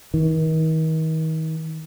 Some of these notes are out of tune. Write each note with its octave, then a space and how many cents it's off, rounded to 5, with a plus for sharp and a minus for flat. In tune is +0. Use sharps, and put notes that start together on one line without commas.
D#3 +40